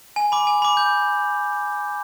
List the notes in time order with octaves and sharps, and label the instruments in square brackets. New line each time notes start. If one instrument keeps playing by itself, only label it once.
[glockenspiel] G#5
B5 D6
G#5
B5 D6
G6